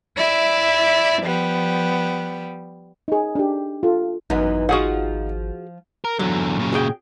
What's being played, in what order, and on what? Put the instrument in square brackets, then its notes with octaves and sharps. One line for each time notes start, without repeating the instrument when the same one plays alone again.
[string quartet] E4 D5 E5
F3 G3 B3
[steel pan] D#4 G#4
D4 G4
F4 A4
[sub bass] G#1 [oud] F#2 E3 B3 [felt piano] D#4
[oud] F3 F4 [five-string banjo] F#4 G#4 F#5
[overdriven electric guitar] A#4
[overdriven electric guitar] E2 D3 [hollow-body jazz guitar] F#3
[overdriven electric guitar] A#2 C#3
[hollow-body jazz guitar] F#4 G#4 G5